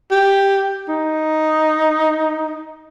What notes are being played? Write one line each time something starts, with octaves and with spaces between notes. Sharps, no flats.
G4
D#4